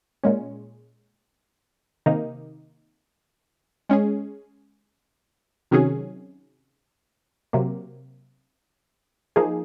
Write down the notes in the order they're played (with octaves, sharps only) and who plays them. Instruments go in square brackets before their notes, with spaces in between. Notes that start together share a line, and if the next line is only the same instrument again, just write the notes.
[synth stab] A#2 G#3 C#4
C3 D#3 A#3 D#4
G#3 C#4 G#4
C3 D#3 F#3 C#4 G#4
C3 F#3 A#3
F3 A#3 D#4 G#4